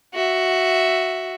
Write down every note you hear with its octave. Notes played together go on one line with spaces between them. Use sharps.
F#4 E5